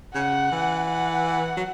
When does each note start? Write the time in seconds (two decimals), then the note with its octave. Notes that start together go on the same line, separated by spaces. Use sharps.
0.15 C#3 F#5
0.52 E3
0.88 F#5
1.57 F#3